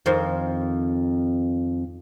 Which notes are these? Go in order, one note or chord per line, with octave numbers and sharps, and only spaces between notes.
F2 D#3 C5